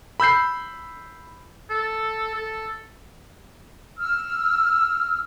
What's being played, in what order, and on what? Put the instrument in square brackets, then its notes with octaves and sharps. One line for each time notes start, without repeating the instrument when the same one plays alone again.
[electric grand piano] B5 E6 G6 C7
[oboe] A4
A4
[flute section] E6 F6